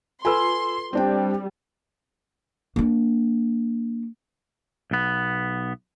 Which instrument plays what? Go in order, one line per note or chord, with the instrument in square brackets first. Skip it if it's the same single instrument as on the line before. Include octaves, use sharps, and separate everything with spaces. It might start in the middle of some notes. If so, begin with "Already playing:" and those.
[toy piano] F4 A4 B4 [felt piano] G#5 E6 [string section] C6
[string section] G3 [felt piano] C4 D4 G5
[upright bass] A#3 D4
[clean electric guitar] B1 B3